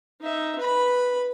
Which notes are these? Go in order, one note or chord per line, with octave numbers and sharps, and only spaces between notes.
D#4 E5
B4 B5